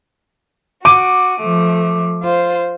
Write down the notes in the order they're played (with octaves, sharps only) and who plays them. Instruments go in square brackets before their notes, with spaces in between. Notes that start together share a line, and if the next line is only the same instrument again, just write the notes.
[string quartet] F#4 [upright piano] D6 D#7
[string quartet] F3 A3
F4 C5